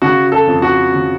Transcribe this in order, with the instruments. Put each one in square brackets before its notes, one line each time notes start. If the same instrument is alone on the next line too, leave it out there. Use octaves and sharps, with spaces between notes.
[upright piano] C#3 F#4
A4
F2
F#4
C#3